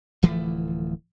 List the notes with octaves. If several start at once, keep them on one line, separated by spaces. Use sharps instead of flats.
D1 E3 F3 A3